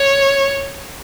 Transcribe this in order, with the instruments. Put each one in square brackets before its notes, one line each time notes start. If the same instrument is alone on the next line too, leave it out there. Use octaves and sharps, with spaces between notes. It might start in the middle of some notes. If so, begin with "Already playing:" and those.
Already playing: [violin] C#5